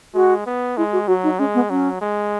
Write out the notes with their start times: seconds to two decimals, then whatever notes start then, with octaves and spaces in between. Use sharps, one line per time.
0.14 G#3 F#4
0.46 B3
0.77 G#3 E4
0.93 F#4
1.08 F#3 F#4
1.24 D#4
1.39 G#3 C#4
1.55 B3
1.70 F#3 C#4
2.01 G#3